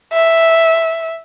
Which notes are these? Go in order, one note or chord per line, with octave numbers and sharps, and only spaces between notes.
E5